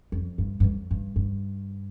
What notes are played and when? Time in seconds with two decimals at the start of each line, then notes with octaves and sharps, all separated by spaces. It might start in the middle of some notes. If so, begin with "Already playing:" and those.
0.12 F2
0.38 G2
0.60 G2
0.64 F2
0.91 G2
1.16 G2